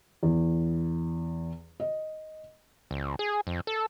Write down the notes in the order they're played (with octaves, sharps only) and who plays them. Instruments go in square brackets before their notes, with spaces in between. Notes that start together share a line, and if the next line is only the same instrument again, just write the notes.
[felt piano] E2
D#5
[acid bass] C#2
G#4
F2
A4